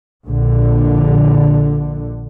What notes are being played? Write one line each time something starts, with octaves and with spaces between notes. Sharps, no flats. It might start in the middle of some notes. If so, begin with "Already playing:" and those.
A#1 D3